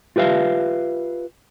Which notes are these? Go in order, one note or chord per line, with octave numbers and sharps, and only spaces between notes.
F4 G4 B4 E5 F5